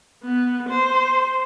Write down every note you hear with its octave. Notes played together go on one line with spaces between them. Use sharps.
B3
C5